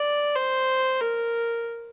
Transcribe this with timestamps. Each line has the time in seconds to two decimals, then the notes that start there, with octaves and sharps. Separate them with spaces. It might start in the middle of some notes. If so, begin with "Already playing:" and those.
Already playing: D5
0.36 C5
1.01 A#4